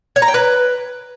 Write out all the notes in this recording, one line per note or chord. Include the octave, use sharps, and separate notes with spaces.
C#5
A#5
G5
B4